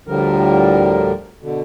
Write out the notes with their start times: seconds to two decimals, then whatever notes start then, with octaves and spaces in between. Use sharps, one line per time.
0.07 D2 A2 D3 F3 G3 A#4
1.42 B2 D3